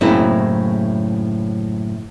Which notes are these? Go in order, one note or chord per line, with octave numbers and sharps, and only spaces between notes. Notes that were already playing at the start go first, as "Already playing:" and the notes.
F#2 A2 C#3 A#3 C4 E4